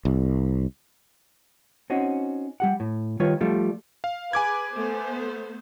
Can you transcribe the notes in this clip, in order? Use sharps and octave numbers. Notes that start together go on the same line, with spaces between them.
C2
C4 C#4 D#4 F#4
G3 G4 F#5
A2
D#3 G3 F4 B4 C#5
F3 G3 A3 F4
F5
G#4 B4 G#5 D6 G#6
A3 B3 C5